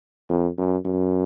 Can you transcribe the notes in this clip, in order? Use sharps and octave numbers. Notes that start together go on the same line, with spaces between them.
F2
F#2
F#2